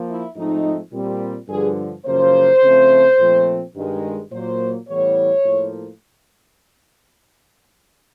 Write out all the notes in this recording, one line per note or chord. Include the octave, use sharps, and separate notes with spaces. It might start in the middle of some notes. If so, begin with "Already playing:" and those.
Already playing: F3 A#3
E4
G#2 F3 A3 C4 D#4
A#2 G3 C4
G2 D3 F3 G#4
F#2 C#3 F3 A#3 C5
C#3 F3 A3 C4
A#2 F3 A3 C4
G2 D#3 G#3
A#2 F#3 A#3 C5
A2 E3 G3 B3 C#5
A2 F3 A#3